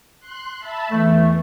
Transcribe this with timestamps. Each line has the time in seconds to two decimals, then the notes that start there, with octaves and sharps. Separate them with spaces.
0.20 C6 F#6
0.59 E5 A5 B5
0.91 E2 E3 A3